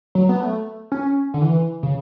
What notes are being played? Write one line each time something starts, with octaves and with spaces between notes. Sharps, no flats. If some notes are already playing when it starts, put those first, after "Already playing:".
F#3
B3
A3
C#4
D3
E3
C#3